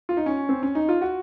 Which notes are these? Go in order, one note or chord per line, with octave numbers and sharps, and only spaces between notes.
F4
D#4
C#4
C4
C#4
D#4
F4
F#4